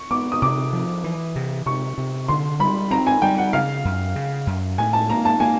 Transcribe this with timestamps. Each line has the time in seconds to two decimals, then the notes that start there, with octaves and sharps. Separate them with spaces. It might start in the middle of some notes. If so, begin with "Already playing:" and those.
Already playing: C#6
0.11 B3 D6
0.32 D#6
0.42 C3 D6
0.73 F3
1.04 E3
1.36 C3
1.66 C3 C#6
1.98 C3
2.28 D3 C6
2.60 G3 B5
2.91 C4 A#5
3.07 G#5
3.22 G3 G5
3.38 F#5
3.53 C#3 F5
3.85 F#2
4.16 C#3
4.47 F#2
4.78 A2 G#5
4.93 A5
5.10 A#3 A#5
5.25 A5
5.40 A#3 G#5